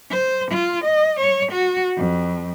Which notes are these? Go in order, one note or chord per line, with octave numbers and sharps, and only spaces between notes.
C5
F4
D#5
C#5
F#4
F2